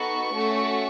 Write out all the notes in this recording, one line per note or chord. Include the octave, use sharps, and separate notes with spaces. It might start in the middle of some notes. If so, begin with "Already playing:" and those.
Already playing: B3 D#4 F#4 A4 C#6
A3 C#4 F#4 A4